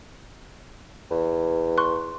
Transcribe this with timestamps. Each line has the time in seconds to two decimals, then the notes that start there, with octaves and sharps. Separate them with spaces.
1.11 E2
1.78 C6 C#6 F#6